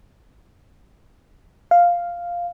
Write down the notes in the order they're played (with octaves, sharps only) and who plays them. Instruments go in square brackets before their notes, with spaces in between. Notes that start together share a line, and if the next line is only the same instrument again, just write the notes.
[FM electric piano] F5